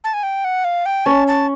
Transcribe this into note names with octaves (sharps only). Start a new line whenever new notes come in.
A5
G#5
G5
F#5
F5
G5
C#4 A5
A5